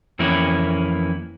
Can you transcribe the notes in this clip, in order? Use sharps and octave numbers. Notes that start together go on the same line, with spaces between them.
F2 E3 A#3 C#4 E4